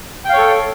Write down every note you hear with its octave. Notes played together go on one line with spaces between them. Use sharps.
A4 C#5 F5 G5